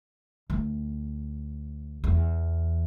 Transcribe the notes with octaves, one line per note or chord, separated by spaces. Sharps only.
D2
E2